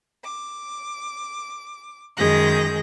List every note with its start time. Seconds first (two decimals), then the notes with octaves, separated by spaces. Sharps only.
0.23 D6
2.17 F#2 D#3 G#3 G#4 G6 A#6